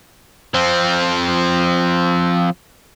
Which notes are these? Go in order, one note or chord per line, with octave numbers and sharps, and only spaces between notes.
F3 C4